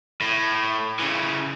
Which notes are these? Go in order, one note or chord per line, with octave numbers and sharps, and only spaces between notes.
A2
C#3 E3